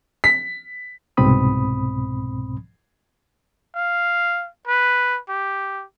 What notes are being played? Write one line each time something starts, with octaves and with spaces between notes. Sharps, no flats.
B6
C2 G#2 B2 C4 B5 D#6
F5
B4
G4